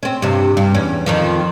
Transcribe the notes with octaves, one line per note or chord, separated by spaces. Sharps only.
C4 C#4
G2 C3
G2
E2 C#4
F2 D#3 F3